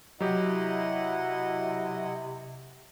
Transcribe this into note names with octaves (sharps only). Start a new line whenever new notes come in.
C3 F#3 E4 G4 D#5 F#5